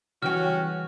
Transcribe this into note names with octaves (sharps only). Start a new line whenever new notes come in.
C#3 E3 G3 C#4 F#4 G4 G5 F6